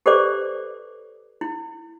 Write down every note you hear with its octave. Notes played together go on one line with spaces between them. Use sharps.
G4 A4 B4 C5 D5 D6
E4